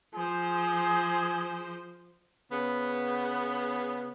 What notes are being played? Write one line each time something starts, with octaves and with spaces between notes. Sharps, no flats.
F3 G#4 C5
C#3 B3